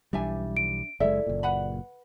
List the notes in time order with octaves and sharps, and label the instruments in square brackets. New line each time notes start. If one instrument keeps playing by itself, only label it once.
[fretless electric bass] B1 E3 G3 [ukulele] D4 E5 G#5
[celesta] D7
[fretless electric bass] F#1 G#3 [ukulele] E4 A4 E5 [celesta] D5
[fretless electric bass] F#1 A#2
[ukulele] B4 F#5 B5